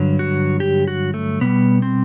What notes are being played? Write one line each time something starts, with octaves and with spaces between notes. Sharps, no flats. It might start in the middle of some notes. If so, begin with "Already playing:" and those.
Already playing: G2 D3 F#3
F#4
G4
F#4
A3
B2 G3 B3
C4